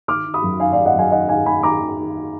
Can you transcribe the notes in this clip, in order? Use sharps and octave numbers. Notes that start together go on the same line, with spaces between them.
D#3 D6 F6
D#3
B5 D#6
F#2
D#3 F5 G#5
D5 F5
D#3
D#5 F#5
F#2 F5 G#5
D#3 D#5 F#5
D#3 F5 G#5
D#3 G#5 B5
D#3 A#5 D6
D#3
D#3